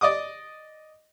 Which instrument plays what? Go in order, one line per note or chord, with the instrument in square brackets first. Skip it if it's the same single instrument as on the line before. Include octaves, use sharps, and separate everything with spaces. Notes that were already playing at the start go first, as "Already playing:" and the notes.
[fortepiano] D5 D#5 D6 D#6